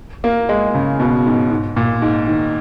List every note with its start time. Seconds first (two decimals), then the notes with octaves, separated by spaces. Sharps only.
0.24 A#3
0.49 G#3
0.74 C#3
1.00 B2
1.26 G#2
1.51 G#2
1.76 A#2
2.02 G#2
2.27 D#3